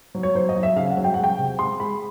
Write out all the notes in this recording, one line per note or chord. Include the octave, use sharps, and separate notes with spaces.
F#3
C#5
F#3 C5
D#5
F#3
E5
C#3 F5
F#5
F#3
G5
G#3 F#5
G5
C3
G#3 C6
G#3 B5